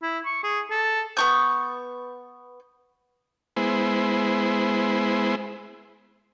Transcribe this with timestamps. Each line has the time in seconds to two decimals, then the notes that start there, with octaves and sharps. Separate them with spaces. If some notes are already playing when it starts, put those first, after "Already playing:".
0.02 E4
0.25 C#6
0.43 G#4
0.71 A4
1.17 B3 C#6 G6
3.56 G#3 B3 E4 C5